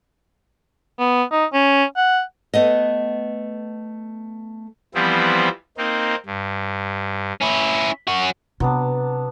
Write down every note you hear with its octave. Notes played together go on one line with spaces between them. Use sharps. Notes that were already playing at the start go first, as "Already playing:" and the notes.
B3
D#4
C#4
F#5
A3 B3 D#5
E3 F3 G3 B3 C4 E4
A#3 C4 D#4
G2
C#4 E4
C#4 F#4
C3 F#3 B3 D4